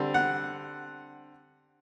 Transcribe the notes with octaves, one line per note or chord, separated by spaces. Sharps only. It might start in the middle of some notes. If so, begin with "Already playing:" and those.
Already playing: D3 G3 C4
F#5